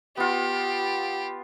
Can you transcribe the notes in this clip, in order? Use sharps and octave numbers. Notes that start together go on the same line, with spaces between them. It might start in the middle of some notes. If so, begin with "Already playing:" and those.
B3 F4 G4